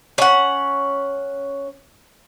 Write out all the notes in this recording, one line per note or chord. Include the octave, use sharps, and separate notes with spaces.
C#4 F#5